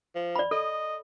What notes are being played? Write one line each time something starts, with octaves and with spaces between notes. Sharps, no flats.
F3
D5 B5
A4 D#5